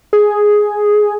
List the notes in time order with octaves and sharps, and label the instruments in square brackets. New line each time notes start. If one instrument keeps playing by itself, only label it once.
[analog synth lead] G#4